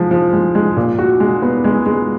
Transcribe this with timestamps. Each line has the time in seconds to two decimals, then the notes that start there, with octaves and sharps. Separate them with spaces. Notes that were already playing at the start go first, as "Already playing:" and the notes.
Already playing: F3 G#3
0.11 F3
0.33 G#3
0.55 G#3
0.77 A#2
0.99 F#4
1.20 G#3
1.42 B3
1.64 G#3
1.86 G#3